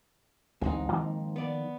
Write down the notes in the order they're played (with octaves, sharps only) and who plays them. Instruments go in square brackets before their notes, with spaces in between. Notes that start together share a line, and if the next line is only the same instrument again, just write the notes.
[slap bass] A1 D2 [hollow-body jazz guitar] G#2 C4 D#4
[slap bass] D#3 F3 A#3
[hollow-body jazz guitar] B3 D5